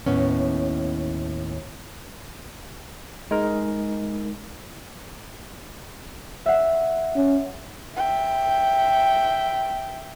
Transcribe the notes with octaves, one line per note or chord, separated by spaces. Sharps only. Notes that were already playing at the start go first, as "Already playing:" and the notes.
D#2 A2 B3 C#4
G#3 D#4 A#4
E5 F#5
C#4
E5 G5